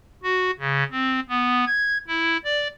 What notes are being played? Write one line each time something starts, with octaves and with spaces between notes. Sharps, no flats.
F#4
C#3
C4
B3
G#6
E4
D5